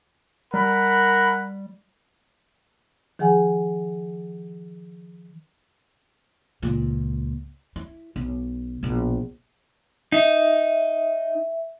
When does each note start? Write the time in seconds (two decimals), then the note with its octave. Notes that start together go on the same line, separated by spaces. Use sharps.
0.54 G3 A#4 F#5 B5
3.19 D#3 F3 G#4 F#5 G#5
6.62 C#2 A#2
7.76 E4
8.16 B1
8.83 A#1 B2
10.12 D#4 E5